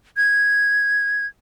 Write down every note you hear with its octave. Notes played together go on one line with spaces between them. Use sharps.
G#6